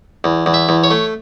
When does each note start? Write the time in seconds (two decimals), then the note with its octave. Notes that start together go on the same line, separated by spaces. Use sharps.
0.24 E2
0.46 E2
0.54 E5
0.69 E2
0.84 C#5
0.91 A3